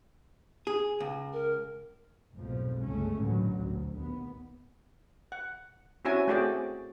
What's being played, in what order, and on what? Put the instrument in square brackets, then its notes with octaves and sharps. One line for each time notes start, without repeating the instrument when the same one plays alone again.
[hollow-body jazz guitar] G#4
C#2
[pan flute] A#4
[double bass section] F1 B1 F2 G#2 B2 F3
G1 C#2 C#3 G#3 A3 C#4
A1 D#2 A#2 D3 F#3
D2
D#2 B3
[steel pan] F#5
C4 C#4 E4 F#4 E5 G#5
A3 C4 F#4 G#4 D5 G5